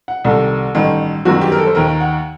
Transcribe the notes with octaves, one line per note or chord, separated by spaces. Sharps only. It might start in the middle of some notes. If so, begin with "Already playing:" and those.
F#5
C2 C3 D#3 A4
A1 G2 D#3
G1 F#2 D#3 F#4
G4
A#4
A4
C5
D#2 D#3 A#4
F#5